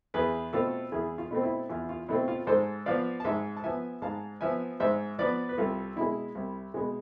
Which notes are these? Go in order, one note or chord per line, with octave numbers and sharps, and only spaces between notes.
E2 G#4 B4
B2 A3 C4 F4 A4
E2 E4 G#4
F4
B2 A3 C4
E4
E2 F4
F4
B2 A3 C4 E4
F4
G#2 A4 C5
F3 B3 D5 F5
A5
G#2 E5 G#5
A5
F3 B3 E5 G#5
G#2 F5 A5
F3 B3 E5 G#5
G#2 C5 E5
F3 B3 B4 D5
B4
C2 F4 A4
B2 G#3 E4
C2
B2 G#3